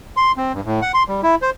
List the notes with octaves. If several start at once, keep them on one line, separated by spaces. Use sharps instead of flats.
C6
C4
G2
A2
F#5
C6
G3
E4
C5